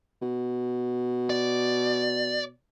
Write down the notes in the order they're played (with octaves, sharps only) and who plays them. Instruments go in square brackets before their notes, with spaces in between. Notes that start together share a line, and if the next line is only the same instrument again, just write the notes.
[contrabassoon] B2
[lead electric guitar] D5